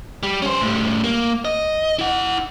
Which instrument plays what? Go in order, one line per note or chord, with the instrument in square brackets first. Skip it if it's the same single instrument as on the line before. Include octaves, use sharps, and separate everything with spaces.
[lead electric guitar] G3
C#4 C5
A2 G3
A#3
D#5
E4 F#5